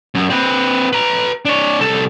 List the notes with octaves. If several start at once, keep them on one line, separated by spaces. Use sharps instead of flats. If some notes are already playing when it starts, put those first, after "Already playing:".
F#2
C4 B4
B4 A#5
D4 C#5
C2 A4